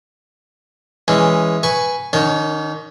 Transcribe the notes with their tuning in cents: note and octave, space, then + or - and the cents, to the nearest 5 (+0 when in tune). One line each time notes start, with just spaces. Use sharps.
E3 +0 G#3 -10 C#4 +0
B4 +0 G#5 +0 C#6 +0
D#3 -10 C#4 +45 C#5 +0